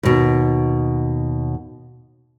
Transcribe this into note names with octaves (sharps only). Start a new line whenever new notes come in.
D#2 B2